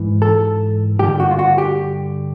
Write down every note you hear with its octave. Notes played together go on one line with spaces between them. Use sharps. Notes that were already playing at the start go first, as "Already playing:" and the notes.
Already playing: G#2 E3
A4
G2 D3 G4
F#4
F4
F#4
G4